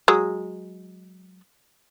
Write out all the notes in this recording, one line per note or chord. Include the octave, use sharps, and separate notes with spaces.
F#3 G#3